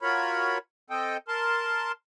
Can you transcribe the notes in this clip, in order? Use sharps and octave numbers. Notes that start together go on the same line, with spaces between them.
F4 F#4 A#4 C#5 B5
C4 A4 D#5 G5
A#4 A5 C6